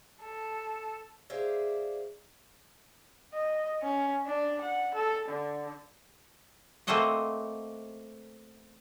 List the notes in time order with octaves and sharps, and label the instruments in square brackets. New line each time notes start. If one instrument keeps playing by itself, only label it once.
[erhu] A4
[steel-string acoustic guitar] G4 G#4 C5 D5 E5 F5
[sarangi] D#5
C#4
D4
F#5
A4
D3
[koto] A3 A#3 C4 C5 D#5 F#5